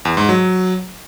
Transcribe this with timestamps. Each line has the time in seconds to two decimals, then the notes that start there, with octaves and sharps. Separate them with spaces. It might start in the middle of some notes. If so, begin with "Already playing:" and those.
0.05 E2
0.17 G#2
0.29 F#3